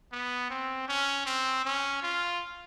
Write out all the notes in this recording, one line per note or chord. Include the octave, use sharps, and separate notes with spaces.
B3
C4
C#4
C4
C#4
F4